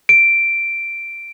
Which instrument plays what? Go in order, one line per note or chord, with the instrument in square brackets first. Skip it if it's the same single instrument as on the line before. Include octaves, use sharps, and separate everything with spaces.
[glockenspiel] D7